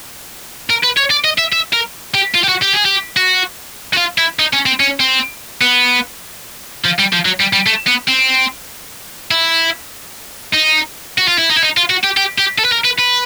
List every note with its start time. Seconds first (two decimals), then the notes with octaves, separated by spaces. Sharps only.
0.70 A#4
0.84 B4
0.97 C#5
1.11 D5
1.24 D#5
1.38 E5
1.53 E5
1.73 A#4
2.14 G4
2.34 F4
2.43 G4
2.48 F#4
2.62 G4
2.73 G#4
2.85 G4
3.17 F#4
3.94 F#4
3.98 F4
4.18 E4
4.39 D#4
4.53 C#4
4.66 C4
4.80 C#4
5.00 C4
5.61 B3
6.85 F3
6.99 G3
7.13 F3
7.25 F#3
7.40 G3
7.53 G3
7.66 A3
7.87 B3
8.08 C4
9.31 E4
10.54 D#4
11.18 F#4
11.28 F4
11.38 E4
11.50 D#4
11.57 E4
11.63 D#4
11.77 F4
11.90 F#4
12.04 G4
12.17 G4
12.38 G4
12.58 A4
12.65 B4
12.72 A#4
12.85 B4
12.99 B4